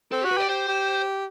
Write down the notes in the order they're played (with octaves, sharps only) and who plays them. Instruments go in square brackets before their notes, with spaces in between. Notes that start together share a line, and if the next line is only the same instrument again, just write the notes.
[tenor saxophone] C4 [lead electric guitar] A4
[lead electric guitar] G4
[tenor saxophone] F#4
[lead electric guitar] B4
[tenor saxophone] G4 [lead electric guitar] D5
[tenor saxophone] G4 [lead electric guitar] C5
[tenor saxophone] G4